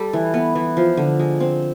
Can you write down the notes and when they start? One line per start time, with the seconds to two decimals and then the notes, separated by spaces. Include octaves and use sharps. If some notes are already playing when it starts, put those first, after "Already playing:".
Already playing: G3 A4
0.13 E3
0.34 B3
0.55 E3
0.77 F3
0.97 D3
1.19 G#3
1.40 C4